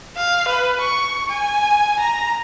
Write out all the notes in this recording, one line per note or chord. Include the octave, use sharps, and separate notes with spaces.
F5
B4
C#6
G#5
A#5